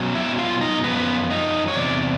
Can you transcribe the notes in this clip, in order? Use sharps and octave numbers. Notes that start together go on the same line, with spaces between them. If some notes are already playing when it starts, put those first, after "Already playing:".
Already playing: B2 F#3 C#4
E4 E5
F4 F5
D#4 D#5
F#2 C#3 F3 B3 B4
D#4 D#5
C#5
E2 C3 D5